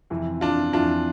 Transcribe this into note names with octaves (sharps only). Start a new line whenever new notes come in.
F2 C3 E3
D4 F4
F2 E3 D4 F4